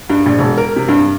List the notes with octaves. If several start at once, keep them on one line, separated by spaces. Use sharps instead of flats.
G2
A#1
E1
A#4
C3
G2